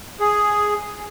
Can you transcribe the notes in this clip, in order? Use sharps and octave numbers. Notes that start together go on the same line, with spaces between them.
G#4